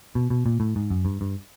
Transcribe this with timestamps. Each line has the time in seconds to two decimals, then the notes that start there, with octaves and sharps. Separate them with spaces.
0.15 B2
0.30 B2
0.46 A#2
0.60 A2
0.76 G#2
0.90 F#2
1.05 G2
1.21 G2